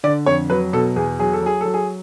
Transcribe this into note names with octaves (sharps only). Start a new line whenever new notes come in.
D3 D5
F2 C#5
F#3 B4
B2 A4
E2 G#4
F#3 G#4
A4
F#3 G#4
F#3 A4
G#4